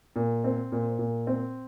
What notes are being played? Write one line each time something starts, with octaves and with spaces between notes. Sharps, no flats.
A#2
C4
A#2
A#2
C4